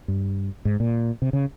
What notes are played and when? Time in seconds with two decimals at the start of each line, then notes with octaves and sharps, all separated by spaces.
0.08 G2
0.65 G#2
0.80 A#2
1.22 C3
1.33 C#3